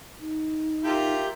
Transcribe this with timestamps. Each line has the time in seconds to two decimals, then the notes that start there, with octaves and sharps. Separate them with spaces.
0.20 D#4
0.84 F4 G4 A#4 E5 G6